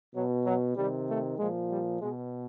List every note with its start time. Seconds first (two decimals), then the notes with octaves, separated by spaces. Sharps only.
0.13 B2 F#3
0.44 F#3
0.75 C3 D#3 G3
1.07 A3
1.37 A#2 F3 G#3
1.69 G3
2.00 B2 G#3